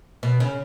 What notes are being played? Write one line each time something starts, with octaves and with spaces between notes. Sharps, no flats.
B2
C#3